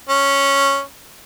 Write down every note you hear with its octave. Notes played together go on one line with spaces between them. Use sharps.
C#4